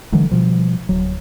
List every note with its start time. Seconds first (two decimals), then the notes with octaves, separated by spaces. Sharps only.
0.12 D3 E3 F#3 G#3
0.30 B2 F3 G3
0.89 D1 F#3